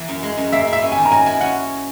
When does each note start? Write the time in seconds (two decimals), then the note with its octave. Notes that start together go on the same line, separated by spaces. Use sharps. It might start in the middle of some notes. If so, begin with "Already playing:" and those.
Already playing: E3 A#3
0.09 F#2
0.23 G#3
0.37 F#2
0.53 A#3 E5
0.67 E4
0.73 E5
0.82 C#4
0.92 G#5
0.98 D#3
1.06 A#5
1.12 F#3 G#5
1.26 E4 G#5
1.41 C#4 F#5